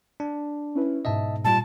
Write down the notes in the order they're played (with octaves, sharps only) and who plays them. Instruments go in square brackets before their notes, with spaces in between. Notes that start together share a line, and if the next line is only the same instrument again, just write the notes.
[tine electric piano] D4
[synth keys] C#4 E4 B4
[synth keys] G#2 B2 [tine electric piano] D#5 E5 A5
[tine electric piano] A#2 G3 F4 [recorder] A5